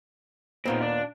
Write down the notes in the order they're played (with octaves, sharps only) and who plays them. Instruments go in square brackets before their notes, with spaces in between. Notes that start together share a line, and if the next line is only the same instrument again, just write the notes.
[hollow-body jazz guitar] D#2 A#2 B3 [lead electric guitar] D#3 C4
[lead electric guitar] D4